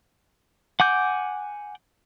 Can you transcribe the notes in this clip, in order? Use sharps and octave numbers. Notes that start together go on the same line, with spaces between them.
F#5 G#5 D6 G6